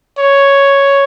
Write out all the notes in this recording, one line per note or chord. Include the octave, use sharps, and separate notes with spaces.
C#5